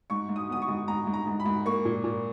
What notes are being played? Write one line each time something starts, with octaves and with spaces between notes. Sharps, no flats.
G#2 C#6
G#2
D#6
B3 D#6
C#6
G#2
G#2 A#5
G#2
A#5
G#2
B5
G#2
A#3 C#6
A#2
A#2